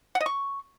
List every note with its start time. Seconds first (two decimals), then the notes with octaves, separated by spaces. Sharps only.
0.15 F#5
0.21 D#5
0.26 C#6